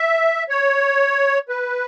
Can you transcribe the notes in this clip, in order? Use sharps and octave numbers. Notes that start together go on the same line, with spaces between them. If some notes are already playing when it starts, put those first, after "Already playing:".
Already playing: E5
C#5
B4